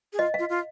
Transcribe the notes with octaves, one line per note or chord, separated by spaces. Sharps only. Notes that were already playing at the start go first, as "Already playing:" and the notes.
G#4
F4 D#5
F4 F5
F4